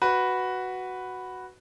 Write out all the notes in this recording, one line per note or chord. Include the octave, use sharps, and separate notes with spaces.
F#4 B4